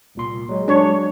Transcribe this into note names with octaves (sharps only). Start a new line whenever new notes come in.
C2 A#2 C6
F#3 G#3
D4 C#5